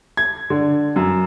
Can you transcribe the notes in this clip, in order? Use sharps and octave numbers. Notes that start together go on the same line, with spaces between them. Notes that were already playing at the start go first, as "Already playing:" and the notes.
G#6
D3
F#2